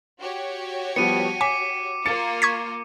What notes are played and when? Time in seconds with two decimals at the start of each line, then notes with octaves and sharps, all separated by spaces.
0.19 F#4 G4 C#5
0.96 F3 G3 B3 C#7 D#7
1.41 G#5 D6 B6
2.06 A#3 F4 A6 C#7
2.42 C#6 G#6 B6